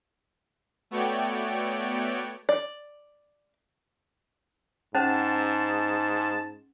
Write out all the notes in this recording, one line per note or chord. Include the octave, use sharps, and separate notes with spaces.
A3 B3 F#4 C#5 D5 G5
D5
G#2 C#4 C5 F#5 A5